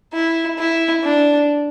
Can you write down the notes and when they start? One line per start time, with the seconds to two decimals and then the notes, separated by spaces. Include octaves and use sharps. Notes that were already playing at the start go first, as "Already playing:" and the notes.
0.13 E4
0.58 E4
1.04 D4